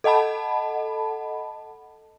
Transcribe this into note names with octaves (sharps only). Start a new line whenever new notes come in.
A4 D#5 F#5 A5 B5